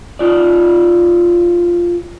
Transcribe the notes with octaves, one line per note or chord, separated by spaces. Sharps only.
D#4 F4 D5